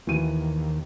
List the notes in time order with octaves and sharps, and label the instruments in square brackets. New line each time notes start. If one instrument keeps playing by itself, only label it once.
[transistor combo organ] D#2 [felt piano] E3 D#7